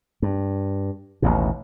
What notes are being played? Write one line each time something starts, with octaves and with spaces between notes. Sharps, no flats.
G2
A1 D#2 B2